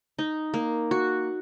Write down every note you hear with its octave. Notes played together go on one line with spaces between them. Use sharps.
D#4
A#3
F#4